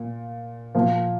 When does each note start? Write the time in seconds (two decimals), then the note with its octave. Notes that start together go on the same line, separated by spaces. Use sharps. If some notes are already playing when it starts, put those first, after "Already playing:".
Already playing: A#2
0.75 A#2 F3 A#3